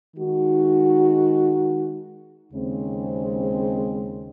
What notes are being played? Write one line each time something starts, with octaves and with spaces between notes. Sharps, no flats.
D#3 G#3 D#4 F#4
D#2 C#3 G#3 C4